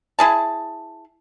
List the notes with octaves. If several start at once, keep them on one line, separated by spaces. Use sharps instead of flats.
E4 G#4 A5